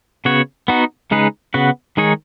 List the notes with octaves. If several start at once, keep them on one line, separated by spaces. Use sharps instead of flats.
C#3 B3 F#4 C#5
B3 D#4 F#4
C#3 G#3 D#4 G#4 B4
C#3 B3 F#4 B4
D#3 G#3 D#4 G#4 C#5